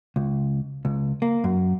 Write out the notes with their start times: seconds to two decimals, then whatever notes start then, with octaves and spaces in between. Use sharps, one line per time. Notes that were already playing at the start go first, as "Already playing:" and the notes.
0.16 C#2
0.85 C#2
1.22 A#3
1.44 F#2